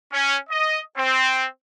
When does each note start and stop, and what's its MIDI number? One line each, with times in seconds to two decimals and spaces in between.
0.12 0.36 61
0.50 0.79 75
0.97 1.45 60